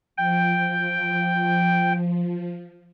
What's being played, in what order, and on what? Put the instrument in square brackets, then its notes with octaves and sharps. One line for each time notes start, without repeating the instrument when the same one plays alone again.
[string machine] F3 [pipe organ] G5